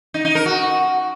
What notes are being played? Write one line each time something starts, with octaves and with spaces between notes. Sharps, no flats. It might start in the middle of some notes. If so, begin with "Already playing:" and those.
D#4
D#4
A#4
F#4